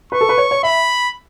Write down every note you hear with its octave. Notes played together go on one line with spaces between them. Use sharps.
B4 C#6
A4
B4
C#5
C#5
E5 B5